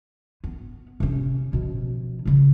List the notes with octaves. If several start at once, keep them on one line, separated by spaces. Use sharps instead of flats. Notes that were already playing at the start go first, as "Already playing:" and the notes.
B3
C3 C#4
B2 F3
G#2 C#3